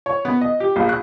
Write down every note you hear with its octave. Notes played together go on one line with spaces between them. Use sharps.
C#5
B3
D#5
G4
A#1
F#6